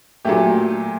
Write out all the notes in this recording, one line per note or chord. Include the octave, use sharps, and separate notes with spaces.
A#2 F#3 A3 G4